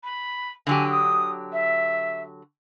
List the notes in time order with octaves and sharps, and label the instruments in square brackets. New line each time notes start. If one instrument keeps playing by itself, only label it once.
[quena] B5
[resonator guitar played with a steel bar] D3 F#3 G4 [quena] G#5
[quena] D#6
E5